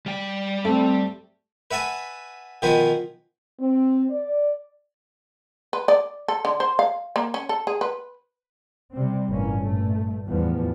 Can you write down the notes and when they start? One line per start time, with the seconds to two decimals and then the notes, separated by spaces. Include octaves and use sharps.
0.06 G3 G5
0.65 A3 C4
1.71 B4 E5 F#5 G#5 A5
2.62 B2 D#3 F3 B4 C5 G#5
3.60 C4
4.10 D5
5.73 B4
5.88 D5
6.28 A4
6.45 D3
6.60 C5
6.79 F5
7.16 A#3
7.34 C#4
7.49 A4
7.67 G#4
7.81 B4
8.94 C3 G3 C4
9.29 G1 A2 E3 A#3 C#4
9.61 G2 A#2 A3
10.28 E2 A2 F3 G3 B3